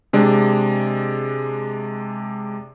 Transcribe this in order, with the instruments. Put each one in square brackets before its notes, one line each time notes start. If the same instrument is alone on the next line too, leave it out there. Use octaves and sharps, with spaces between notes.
[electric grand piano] C3 G#3 D4